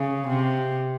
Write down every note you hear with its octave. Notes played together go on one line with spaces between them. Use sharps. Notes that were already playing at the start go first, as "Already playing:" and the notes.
Already playing: C#3
C3